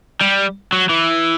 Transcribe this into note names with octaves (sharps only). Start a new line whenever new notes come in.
G3
F#3
E3